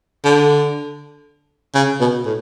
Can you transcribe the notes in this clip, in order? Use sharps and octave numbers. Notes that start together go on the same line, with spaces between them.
D3
C#3
B2
A2